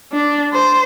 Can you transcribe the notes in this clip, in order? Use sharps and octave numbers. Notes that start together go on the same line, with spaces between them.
D4
C5